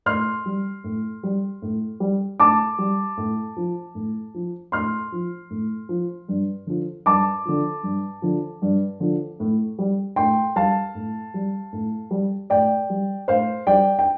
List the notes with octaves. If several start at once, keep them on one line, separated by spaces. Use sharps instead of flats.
A2 C6 F6
G3
A2
G3
A2
G3
A2 A5 D6
G3
A2
F3
A2
F3
A2 C6 F6
F3
A2
F3
G2
D3 F3
G2 A5 D6
D3 F3
G2
D3 F3
G2
D3 F3
A2
G3
A2 G5 C6
G3 F5 A5
A2
G3
A2
G3
A2 D5 G5
G3
A2 C5 F5
G3 D5 G5
G5